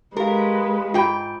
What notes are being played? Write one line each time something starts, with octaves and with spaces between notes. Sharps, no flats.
G#3 G4 A#4 B4 F5
G#2 F4 D#5 G5 B5 G6